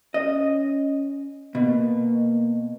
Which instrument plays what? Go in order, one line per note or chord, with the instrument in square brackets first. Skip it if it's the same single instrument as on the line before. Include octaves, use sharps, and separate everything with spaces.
[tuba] C#4 [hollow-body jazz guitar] D#5
[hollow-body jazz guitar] B2 [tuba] A#3